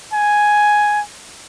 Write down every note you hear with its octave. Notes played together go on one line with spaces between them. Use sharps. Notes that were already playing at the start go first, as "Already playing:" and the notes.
G#5